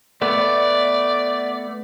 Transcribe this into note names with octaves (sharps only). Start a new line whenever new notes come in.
A3 B3 D5